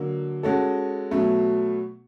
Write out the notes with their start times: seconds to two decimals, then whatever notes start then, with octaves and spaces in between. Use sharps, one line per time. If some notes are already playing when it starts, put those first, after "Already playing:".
Already playing: D3 F#3 A#3
0.43 G#3 C#4 F#4 A4
1.11 B2 F#3 A3